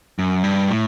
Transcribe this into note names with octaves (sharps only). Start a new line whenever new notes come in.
F#2
G2
A2